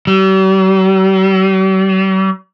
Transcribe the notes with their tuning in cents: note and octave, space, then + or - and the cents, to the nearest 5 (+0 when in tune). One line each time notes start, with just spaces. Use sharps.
G3 -45